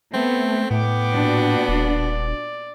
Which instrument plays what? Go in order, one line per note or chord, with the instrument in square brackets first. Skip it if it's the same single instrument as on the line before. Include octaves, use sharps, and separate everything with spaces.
[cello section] A3 [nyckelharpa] B3 [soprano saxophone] C4
[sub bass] A2 [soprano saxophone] B3 [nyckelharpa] G5 D6
[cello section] A#2 D4 F#4
[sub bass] D#1 [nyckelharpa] D5